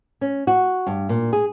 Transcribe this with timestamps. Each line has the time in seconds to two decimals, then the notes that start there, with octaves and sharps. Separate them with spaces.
0.21 C#4
0.47 F#4
0.87 G2
1.09 A#2
1.33 G#4